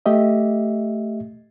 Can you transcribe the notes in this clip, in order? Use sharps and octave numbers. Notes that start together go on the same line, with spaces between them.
A3 G4 D#5 E5